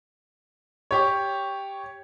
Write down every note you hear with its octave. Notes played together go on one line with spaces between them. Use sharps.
G4 C#5